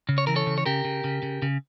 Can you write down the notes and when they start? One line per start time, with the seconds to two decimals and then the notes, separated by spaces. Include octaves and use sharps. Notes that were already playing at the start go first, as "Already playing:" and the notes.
0.09 C#3
0.18 C#5
0.27 E3 A#4
0.36 A4 C#5
0.47 C#3
0.58 C#5
0.66 C#3 G4 A#4
0.85 C#3
1.04 C#3
1.23 C#3
1.42 C#3